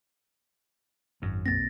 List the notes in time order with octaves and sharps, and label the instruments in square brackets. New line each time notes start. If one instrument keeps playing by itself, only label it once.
[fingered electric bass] G#1 [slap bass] F#2
[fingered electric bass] B1 A#3 C4 [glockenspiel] A6 A#6